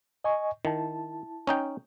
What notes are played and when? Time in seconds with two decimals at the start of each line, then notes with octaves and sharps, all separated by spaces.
0.24 D#5 G#5 C#6
0.65 D#3 E4 A5
1.47 C#4 D#4 G5